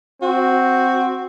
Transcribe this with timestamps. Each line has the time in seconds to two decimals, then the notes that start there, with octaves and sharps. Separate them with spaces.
0.22 C4 F#4